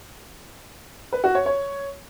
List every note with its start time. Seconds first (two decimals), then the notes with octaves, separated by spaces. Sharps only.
1.13 B4
1.24 F#4
1.35 C#5
1.46 C#5